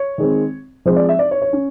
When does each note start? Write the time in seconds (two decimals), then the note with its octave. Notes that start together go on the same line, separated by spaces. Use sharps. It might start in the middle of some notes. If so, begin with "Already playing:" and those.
Already playing: C#5
0.18 D#3 G#3 C4
0.85 F3 G#3 C4 C5
0.96 D5
1.09 E5
1.19 D5
1.31 C#5
1.42 C#5
1.53 C#4